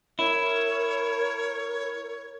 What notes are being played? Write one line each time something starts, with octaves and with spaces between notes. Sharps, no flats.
E4 A#4 C#5